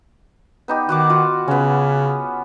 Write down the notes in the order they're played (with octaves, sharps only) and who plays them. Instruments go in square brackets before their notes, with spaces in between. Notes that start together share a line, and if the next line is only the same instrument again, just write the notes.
[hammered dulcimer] B3 D#4 G4
[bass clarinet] D#3 [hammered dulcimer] F#4 F#5 D6
[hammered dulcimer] F4 F#4
[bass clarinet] C#3 [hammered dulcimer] B3 C#4